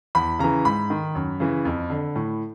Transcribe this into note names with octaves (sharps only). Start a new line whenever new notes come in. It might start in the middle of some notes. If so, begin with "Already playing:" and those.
E2 B5
C#3 E3 A#5
G#2 B5
D#3
F#2
C#3 E3
F2
D3
A2